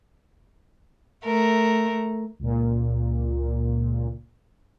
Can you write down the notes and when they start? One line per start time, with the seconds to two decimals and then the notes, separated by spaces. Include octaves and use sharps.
1.25 A3 A#4
2.39 C#2 A#2